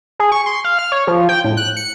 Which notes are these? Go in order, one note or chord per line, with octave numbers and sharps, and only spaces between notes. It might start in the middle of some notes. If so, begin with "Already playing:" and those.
G#4
C#6
C6
F5
F6
C#5
F3
G5
A2
F#6
C#7